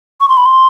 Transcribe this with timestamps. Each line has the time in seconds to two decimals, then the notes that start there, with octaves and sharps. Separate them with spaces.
0.21 C#6
0.29 C6
0.37 B5
0.46 C6